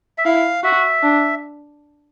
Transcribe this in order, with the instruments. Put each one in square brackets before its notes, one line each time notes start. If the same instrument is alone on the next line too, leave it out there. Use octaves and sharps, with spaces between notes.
[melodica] E5
[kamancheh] E4 [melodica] F5
[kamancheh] F#4 [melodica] E5
[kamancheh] D4